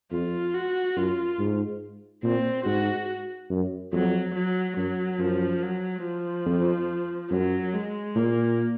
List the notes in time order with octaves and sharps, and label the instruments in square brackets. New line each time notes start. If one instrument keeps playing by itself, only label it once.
[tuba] F2 [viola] F4
[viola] F#4
[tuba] F#2 [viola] F4
[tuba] G#2
[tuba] A#2 [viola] C4
[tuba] G#2 [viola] F#4
[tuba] F#2
[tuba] F2 [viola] F#3
[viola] F#3
[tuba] F#2 [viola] F#3
[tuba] F#2 [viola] F3
[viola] F#3
F3
[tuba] F2
[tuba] F#2 [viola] F#3
[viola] G#3
[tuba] A#2 [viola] A#3